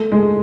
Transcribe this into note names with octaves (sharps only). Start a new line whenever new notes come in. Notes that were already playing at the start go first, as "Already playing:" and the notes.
Already playing: A3
G#3